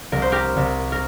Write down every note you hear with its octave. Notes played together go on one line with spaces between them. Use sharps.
C2 A#4
C5
G4 A#4
C2
A#4